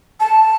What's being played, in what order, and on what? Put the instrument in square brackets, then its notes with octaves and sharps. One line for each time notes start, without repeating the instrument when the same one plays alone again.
[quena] A5